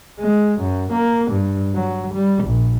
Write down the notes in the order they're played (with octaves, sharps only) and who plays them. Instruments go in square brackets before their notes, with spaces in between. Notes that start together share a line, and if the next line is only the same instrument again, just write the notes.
[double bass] G#3
F#2
A#3
G2
F#3
G3
A#1